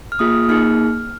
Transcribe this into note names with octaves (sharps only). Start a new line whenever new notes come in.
F6
A#3 F4 G#4 D#6
A#3 D#4 G#4 F6